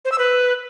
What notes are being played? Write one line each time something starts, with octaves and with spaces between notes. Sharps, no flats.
C5
E6
B4